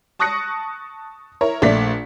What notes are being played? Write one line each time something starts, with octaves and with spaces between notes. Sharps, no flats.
A5 C#6 D#6 F#6 A#6 C#7
E4 A#4 C#5
A#1 A3 D5 B6